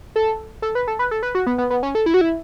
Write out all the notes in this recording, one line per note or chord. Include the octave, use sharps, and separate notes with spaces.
A4
A4
B4
A4
B4
A4
B4
F#4
B3
B3
B3
C#4
A4
E4
F#4
E4